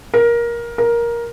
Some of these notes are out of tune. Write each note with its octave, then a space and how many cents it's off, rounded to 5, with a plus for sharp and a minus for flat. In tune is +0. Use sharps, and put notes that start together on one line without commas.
A#4 +15
A#4 +10